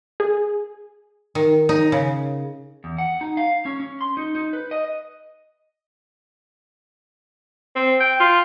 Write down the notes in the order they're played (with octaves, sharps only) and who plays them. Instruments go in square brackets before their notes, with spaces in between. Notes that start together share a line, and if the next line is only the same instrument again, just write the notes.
[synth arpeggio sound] G#4
[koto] D#3
D#4
C#3
[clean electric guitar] E2
F#5
D#4
F5
C#4
C#4
C6
D#4
D#4
B4
D#5
[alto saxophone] C4
G5
F4